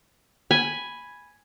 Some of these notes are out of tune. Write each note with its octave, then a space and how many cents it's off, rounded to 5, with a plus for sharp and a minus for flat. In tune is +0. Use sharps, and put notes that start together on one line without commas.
G#5 +0 B5 +0